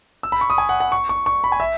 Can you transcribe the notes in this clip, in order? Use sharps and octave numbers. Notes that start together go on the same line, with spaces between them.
E6
B5
C#6
D#6
G#5
F#5
F#5
C#6
C#6
C#6
B5
G#5
E5